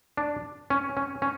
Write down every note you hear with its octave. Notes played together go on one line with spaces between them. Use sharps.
D4
C#4
C#4
C#4